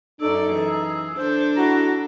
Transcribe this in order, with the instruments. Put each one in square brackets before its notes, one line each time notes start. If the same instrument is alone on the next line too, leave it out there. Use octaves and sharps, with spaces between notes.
[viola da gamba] F#2 C#4 D5 [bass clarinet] D#4 [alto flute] A4 [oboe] E6
[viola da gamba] E3 G#4
[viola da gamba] D4 A4 [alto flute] C5
[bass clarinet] E4 [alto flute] F#4 [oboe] A#5